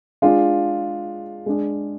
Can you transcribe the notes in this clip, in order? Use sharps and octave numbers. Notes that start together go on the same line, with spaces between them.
G#3 D4 F4 G#4
G#3 D4 G#4